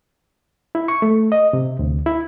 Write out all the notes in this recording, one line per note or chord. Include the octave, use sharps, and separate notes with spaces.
E4
C#6
A3
D#5
C3
D2
E4